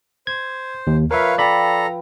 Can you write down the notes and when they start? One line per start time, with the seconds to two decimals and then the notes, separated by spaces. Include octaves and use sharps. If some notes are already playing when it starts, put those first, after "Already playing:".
0.27 C5 G#6
0.87 D#2
1.11 F3 A#4 B4 C#5 E5 F5
1.38 A4 B4 D5 F5 G5 A#5 B5